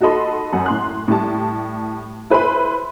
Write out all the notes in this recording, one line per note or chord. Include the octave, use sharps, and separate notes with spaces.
D#4 F#4 A4 D#5 B5 C6
F#2 F#5
A2 C6 F#6
A2 G3 G4 A5
E4 B4 C5 E5 B5